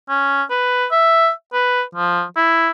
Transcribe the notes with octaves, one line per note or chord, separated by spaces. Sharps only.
C#4
B4
E5
B4
F3
E4